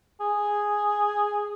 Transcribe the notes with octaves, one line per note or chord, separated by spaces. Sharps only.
G#4